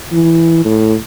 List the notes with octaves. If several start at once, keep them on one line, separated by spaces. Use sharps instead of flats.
E3
A2